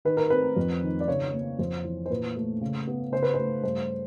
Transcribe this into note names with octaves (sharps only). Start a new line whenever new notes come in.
D#3 B4
A#4
C4 B4
F2
D#3
D5
C#3 C#5
A#3
F2 C5
E3
C5
A#2 B4
A3
C#3
B3
C#3 C5
B4
A3 C5
G2 C5